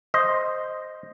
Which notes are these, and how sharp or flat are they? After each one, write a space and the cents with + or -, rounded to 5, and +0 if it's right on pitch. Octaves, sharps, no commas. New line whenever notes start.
C5 +0 D#5 +0